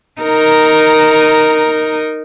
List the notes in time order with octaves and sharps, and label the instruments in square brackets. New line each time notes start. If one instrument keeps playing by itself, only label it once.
[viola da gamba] D#4 A#4